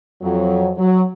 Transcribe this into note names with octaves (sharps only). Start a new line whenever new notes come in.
F2 F#3
F#3